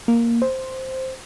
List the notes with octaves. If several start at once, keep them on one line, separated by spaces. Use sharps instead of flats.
A#3
C5